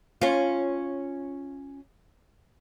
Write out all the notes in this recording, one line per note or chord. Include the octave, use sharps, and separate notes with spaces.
C#4 F4